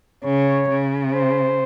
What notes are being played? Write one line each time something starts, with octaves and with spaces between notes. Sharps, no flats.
C#3 C#5
C#3
C5